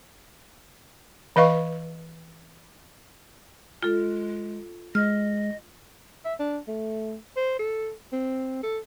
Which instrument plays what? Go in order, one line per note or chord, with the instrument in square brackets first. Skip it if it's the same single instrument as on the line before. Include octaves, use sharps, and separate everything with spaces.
[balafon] E3 B4 D#5 F5 C#6
[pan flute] G#3 [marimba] F4 A4
[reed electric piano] G#3 [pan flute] D#5 [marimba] F6
[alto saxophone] E5
D4
A3
C5
A4
C4
A4